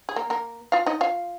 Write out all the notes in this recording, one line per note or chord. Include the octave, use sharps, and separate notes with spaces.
G#4
A#3 A#4
A#3 A#4
F4 F5
D#4 D#5
F4 F5